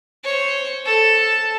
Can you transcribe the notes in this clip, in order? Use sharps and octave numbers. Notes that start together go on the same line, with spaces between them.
C5 C#5
A4 A5